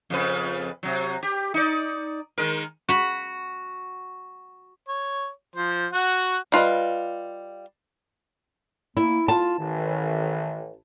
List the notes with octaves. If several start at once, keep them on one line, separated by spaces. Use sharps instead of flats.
F2 C#3 B4
C3 F#3
G4
D#4 D5
D#3 G#3 A#4
F#4 B5
C#5
F3 C5
F#4 F#5
G3 F4 B4 D#5
A#3 E4
F4 A5
A1 D#3